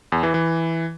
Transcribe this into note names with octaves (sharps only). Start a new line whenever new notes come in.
E2
E3
E3